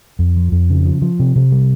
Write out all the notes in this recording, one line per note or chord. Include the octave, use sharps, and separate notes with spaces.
F2
F3
F2
C#3
F3
F3
C3
C3
G3